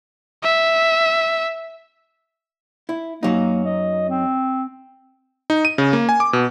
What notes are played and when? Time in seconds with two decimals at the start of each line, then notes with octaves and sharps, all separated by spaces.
0.43 E5
2.89 E4
3.23 F#2 F#3 A#3 D#4
3.65 D#5
4.09 C4
5.50 D#4
5.65 D#7
5.78 C#3
5.93 A#3
6.09 G#5
6.20 D6
6.33 B2